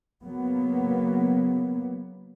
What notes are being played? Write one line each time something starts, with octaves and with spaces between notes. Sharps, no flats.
C#3 F#3 A#3 B3